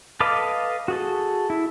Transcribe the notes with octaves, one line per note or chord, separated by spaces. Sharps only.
A4 B4 D#5 F5 D6
F#4 G#4 A4
E4